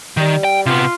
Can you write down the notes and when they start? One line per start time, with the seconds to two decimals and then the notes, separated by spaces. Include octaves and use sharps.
0.17 D#3 G3
0.44 G5
0.66 C3 B3 F4